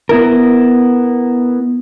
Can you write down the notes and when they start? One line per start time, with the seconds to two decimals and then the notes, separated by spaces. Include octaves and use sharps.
0.09 B3 E4 A#4